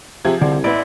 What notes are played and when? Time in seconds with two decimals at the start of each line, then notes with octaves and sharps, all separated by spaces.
0.25 C3 F3 G#4 G#6
0.41 C2 D3
0.64 A1 B3 E4 D5